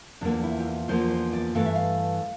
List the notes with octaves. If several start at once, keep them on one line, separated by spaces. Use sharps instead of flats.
E2 D3 F3 A#3 D4
E4
G4
F4
E2 D3 F3 A#3 C5
C5
D5
G2 E3 A3 F5
E5
F5